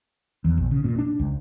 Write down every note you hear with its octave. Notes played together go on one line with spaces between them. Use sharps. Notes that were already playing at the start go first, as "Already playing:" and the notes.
E2
A#1
C#3
A#2
D4
C#2